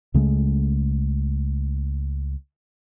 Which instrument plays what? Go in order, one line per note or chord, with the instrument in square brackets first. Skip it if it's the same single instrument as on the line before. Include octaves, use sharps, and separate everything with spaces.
[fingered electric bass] C#2 C#3 G#3 A3